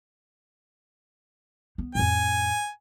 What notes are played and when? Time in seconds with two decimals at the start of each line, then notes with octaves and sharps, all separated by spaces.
1.78 B3
1.95 F2 A2 G#5